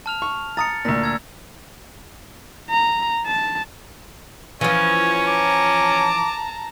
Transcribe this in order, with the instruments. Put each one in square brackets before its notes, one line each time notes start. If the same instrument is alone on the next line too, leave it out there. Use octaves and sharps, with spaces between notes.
[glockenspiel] A5 F6 F7
[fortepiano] C#6
[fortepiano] A#5 D#6 [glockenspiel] A6 C#7
[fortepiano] D2 A#2 [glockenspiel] A#5 A#6
[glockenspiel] E6 G#6
[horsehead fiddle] A#5
A5
[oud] E3 F3 [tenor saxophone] C#4 [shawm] C#5
[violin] A5 A#5 [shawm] D6